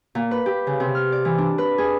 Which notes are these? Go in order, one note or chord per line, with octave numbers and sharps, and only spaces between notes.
A#2
B4
G4
C#3
C3
F6
D5
E3
D4
B4
G#4